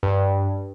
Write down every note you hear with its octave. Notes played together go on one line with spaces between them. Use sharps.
G2